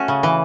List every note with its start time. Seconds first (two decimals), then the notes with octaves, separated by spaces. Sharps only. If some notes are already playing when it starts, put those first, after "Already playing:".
Already playing: A3 C#4 F#4
0.08 C#3
0.23 E3